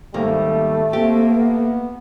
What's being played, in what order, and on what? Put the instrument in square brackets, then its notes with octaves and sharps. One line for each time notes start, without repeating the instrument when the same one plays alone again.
[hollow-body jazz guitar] D#2 G#2 A#3 [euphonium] G3 [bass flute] A3
[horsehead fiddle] A#3 [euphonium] C4 [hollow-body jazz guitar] G4
[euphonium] B3